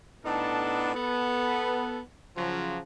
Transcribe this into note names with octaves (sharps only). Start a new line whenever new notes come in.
A2 B3 D4 D#4 A4 A5
B3 A4
C#3 F3 F#3